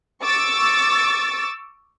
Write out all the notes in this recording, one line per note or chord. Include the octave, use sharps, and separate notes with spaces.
C#6 D6 E6 A6